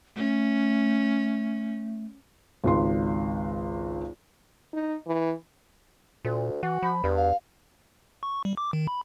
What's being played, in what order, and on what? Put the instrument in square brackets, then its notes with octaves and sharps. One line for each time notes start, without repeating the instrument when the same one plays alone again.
[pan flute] A3 [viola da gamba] C#4
[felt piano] G#1 C#2 C6
[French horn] D#4
E3
[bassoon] D2 [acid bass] A#2
[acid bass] E3 [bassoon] F#4
[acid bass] F3 [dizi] B5
[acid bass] E2 [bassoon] G2
[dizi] F5
[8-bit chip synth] C#6
G3
D6
D#3
B5